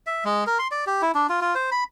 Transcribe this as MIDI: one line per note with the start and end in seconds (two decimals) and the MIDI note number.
0.07 0.24 76
0.25 0.44 56
0.47 0.58 70
0.59 0.68 84
0.71 0.85 74
0.87 1.02 67
1.02 1.12 64
1.15 1.27 62
1.29 1.40 65
1.41 1.55 65
1.55 1.70 72
1.72 1.84 83